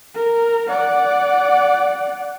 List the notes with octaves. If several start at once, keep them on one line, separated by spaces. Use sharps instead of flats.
A#4
D5 F#5